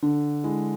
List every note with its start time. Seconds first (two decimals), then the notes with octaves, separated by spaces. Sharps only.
0.02 D3 D4
0.44 G#3 E4